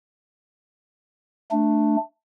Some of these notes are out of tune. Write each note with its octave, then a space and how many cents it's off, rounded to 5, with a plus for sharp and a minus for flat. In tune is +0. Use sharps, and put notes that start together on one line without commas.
A3 +0 D4 +10